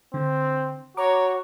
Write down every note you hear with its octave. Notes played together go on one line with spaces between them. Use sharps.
D3 C4
F#4 C#5 A#5 D6